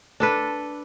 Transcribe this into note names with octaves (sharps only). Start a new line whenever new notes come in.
D4 A4 B4